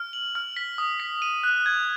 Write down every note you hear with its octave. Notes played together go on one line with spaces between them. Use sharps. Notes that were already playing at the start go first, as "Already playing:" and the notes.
Already playing: F6
F#7
F6
B6
D#6
B6
D#7
F#6
G#6